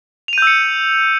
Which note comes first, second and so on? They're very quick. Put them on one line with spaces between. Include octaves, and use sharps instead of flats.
F7 D#7 G6 E6 C#7